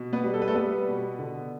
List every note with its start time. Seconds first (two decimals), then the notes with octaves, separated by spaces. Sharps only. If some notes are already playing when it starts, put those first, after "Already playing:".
Already playing: B2
0.13 B3 B4
0.24 G3
0.34 A4
0.42 B4
0.48 A3 A4
0.55 G3 B3 B4
0.88 B2
1.19 D3